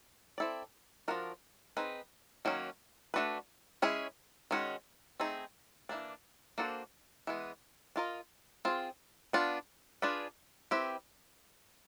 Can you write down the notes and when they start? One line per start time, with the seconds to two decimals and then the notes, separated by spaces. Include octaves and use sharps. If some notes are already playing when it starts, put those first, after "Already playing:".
0.38 C4 E4 A4 D5
1.08 F3 A#3 D4 F#4 A#4
1.77 C4 D#4 G#4 B4
2.45 D#3 F#3 A#3 C#4
3.14 A3 D4 F#4 B4
3.82 G#3 C#4 E4 G#4
4.51 D#3 G#3 C#4 F#4
5.20 A3 C4 D#4 G#4
5.89 E3 G3 A#3 D4
6.58 A#3 D4 F#4 A4 C5
7.27 E3 G#3 B3
7.96 D4 F4 A#4 D#5
8.65 C4 F4 G#4
9.33 B3 D4 F4
10.02 D4 F4 G#4 B4 D5
10.71 C4 E4 G4 B4